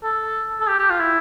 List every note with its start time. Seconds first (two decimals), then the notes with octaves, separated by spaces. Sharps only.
0.03 A4
0.60 A4
0.68 G4
0.79 G4
0.90 F4
1.00 E4